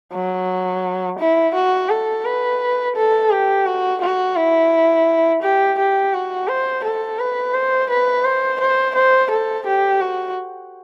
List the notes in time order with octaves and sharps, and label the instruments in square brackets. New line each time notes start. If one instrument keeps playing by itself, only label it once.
[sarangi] F#3
E4
F#4
A4
B4
A4
G4
F#4
F#4
E4
G4
G4
F#4
C5
A4
B4
C5
B4
C5
C5
C5
A4
G4
F#4